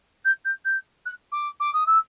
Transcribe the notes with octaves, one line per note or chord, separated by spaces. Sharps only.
G6
G6
G6
F#6
D6
D6
D#6
E6